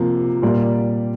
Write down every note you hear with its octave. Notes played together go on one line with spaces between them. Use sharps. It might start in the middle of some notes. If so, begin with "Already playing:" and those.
Already playing: C3 F3 A#3
A#2 G3 A#3 D5